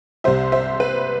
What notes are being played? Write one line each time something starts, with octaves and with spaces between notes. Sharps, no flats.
C2 C3 G3 C5 E5
C5 E5
B4